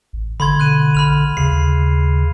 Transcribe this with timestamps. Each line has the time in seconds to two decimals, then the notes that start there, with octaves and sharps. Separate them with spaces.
0.13 A1
0.40 D3 B5 C6 G#6
0.60 B2 F#6 D#7
0.95 A#1 B5 F6 F7
1.37 D#2 C#3 C7